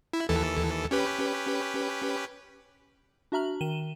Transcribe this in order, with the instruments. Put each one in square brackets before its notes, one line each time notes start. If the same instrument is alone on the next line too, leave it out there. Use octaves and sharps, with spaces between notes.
[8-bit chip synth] E4
D#2 E3 A4
C#4 G4 B4
[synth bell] D4 F#4 E5 A#5 F6 F#7
D#3 D#7 E7 G7